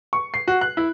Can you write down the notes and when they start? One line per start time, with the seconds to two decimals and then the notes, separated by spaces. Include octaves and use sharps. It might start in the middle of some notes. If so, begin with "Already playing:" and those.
0.13 C#6
0.34 C7
0.48 F#4
0.61 F#6
0.77 E4